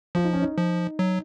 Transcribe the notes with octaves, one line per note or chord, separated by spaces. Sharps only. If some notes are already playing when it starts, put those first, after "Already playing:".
F3 F4
D#4
C#4
D#4
F3
F#3